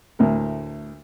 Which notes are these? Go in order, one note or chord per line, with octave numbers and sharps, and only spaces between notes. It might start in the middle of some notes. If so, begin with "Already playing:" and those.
D2 A2 A#4